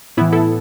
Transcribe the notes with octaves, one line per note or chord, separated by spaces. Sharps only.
A2 E3 B3 E4
E4 A4